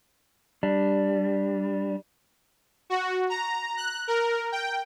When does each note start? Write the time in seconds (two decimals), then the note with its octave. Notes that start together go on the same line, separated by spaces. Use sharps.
0.63 G3 D4
2.90 F#4
3.29 A#5
3.77 F#6
4.08 A#4
4.52 G5